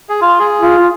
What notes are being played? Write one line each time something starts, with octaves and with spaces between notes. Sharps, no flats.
G#4
F4
G#4
F4